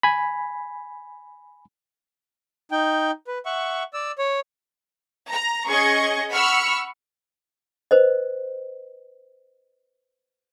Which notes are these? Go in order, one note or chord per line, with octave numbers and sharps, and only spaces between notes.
G#5 B5
D#4 G5
B4
E5 F#5 C#6
D5 E6
C#5
A#5
C#4 G#4 D#5 C#6 G#6
F#5 B5 C#6 E6 F6
B4 C5 D#5